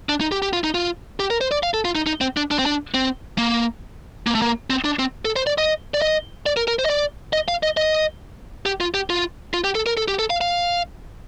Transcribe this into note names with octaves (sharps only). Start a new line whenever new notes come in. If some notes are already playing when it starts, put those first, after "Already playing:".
D4
D#4
G4
G4
F4
D#4
F4
G4
A#4
C5
D5
F5
A4
F4
D#4
D#4
C4
D4
D4
C4
D4
C4
A#3
A#3
A3
A#3
C4
D4
C4
A4
C5
D5
D#5
D5
D#5
D5
A#4
A#4
C5
D#5
D5
D#5
F5
D#5
D#5
G4
F4
G4
F4
F4
G4
A4
A#4
A4
G4
A4
F5
F5